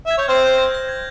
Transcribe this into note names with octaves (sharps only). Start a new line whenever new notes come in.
E5 G#6
C#5 G6
C4 C5 F6
G6
A#6
A#6
G#6